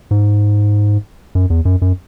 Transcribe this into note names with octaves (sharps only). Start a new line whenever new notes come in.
G#2
F#2
E2
F#2
F#2